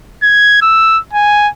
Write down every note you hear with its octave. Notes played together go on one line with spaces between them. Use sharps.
G#6
E6
G#5